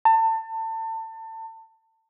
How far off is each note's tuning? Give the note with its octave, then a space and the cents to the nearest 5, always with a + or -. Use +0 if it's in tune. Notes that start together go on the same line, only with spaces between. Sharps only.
A5 +30